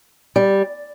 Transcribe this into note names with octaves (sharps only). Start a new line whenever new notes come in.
G3